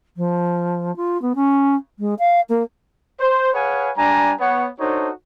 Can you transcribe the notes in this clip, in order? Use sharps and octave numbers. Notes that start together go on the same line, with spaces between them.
F3
F4
B3
C#4
G#3
F5
A#3
C5
G#4 B4 C#5 F5 F#5 G#5
G3 D4 G#5 A#5
B3 C#5 F#5
D4 D#4 F#4 A4 C5 C#5